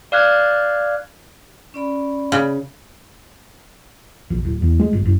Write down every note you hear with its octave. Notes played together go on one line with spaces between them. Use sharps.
D5 F5 F6 F#6 G#6
C#4 D5 B5
C#3
A#1
D1
E2
G#3
G1
F#1